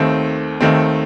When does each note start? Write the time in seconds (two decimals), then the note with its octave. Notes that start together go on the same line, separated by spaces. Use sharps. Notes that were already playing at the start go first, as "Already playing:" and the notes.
Already playing: D#2 D#3 A3 C4
0.61 D#2 D#3 A3 C4